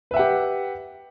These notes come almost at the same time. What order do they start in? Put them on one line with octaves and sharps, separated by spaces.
B4 E5 F#5 G4